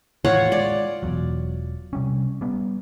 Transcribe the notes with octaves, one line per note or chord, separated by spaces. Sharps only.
A2 D#3 E3 F4 C#5 F#5
G#3 D5
E1 E2 F#3
C3 G3 C#4
G3 B3